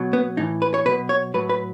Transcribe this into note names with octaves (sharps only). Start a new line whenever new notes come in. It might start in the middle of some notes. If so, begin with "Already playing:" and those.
Already playing: B2 F#3
B3
A2 E3 D#4
B4
C#5
B2 F#3 B4
C#5
A2 F#3 B4
B4